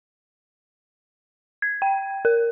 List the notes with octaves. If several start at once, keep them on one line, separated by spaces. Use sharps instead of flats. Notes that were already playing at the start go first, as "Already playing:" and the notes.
G#6
G5
A#4